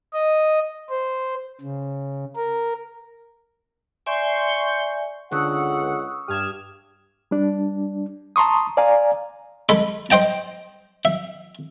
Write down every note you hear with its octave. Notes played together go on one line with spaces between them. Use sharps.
D#5
C5
C#3
A#4
D5 E5 G#5 C6 C#6 G6
C#2 D3 F#5 C#6 D#6 E6
G2 G4 D#6 F6 G#6 E7
G3 D4
A5 A#5 C6 C#6 D#6
D5 F5 G#5 A#5
G#3 A4 B5
C5 D#5 G5 A5
E5